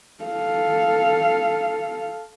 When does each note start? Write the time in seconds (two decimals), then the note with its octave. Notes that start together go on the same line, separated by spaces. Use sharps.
0.24 A4 F5